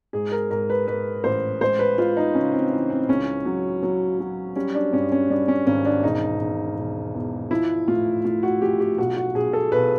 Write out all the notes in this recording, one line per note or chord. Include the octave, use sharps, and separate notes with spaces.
G#2 G#4
A#4
G#2 A#4
B4
G#2 B4
A1 C5
G#3 C5
B4
G#3 F4
D#4
C#3 C#4
C4
E3
C4
C#2 C#4
F#3
F#3
F#3
G3 C#4
D4
G2 C#4
C#4
G3 D4
C#4
G#1 C#4
D4
E1 D#4
E1
E1
E2
F3 E4
A2 F4
A2 F4
F#4
F3 G4
G4
B1 F#4
F#4
B1 G#4
A4
B1 B4